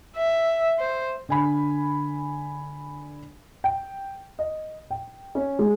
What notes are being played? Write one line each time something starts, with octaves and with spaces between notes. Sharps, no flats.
E5
C5
D3 G#5 B5
G5
D#5
G5
C#4
G#3